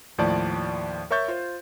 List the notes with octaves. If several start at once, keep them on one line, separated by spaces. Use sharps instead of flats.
D#2 A2 F3 D5 A5
A#4 C#5 E5 C#6 G6 A6
F4 C5